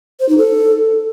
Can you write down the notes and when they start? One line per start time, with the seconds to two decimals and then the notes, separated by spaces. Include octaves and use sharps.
0.20 C5
0.29 D#4
0.38 A4